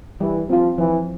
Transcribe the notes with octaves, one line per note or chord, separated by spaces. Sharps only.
E3 G3
F3 C4 F4
E3 F3